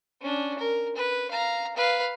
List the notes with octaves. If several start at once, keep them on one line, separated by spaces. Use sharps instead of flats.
C#4 D4
A#4
B4
F5 A#5
B4 F5